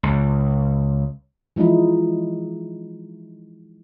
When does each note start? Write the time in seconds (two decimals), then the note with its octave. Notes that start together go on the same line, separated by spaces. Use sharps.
0.03 C#2
1.56 E3 F3 G#3 D#4 E4